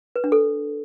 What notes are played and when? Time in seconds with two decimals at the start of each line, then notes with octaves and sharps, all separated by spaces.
0.16 B4
0.24 D4
0.32 A4